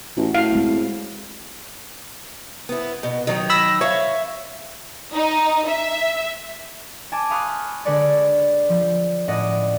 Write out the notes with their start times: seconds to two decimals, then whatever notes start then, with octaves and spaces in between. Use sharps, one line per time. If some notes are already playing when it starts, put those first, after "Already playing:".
0.17 A1 F#4
0.35 A2 F5
0.53 G#3 C4
2.69 B3 E4
3.03 B2
3.27 D#3 F#3 D#4
3.50 B5 E6 A#6
3.81 C#5 E5 F5
5.15 D#4
5.68 E5
7.12 G#5 A5 D6
7.31 F5 B5 C#6 D#6 F6 F#6
7.85 D3 G#3 G#4 B4 C#5 D5
8.69 F3
9.28 A2 C#4 D5 D#5 F#5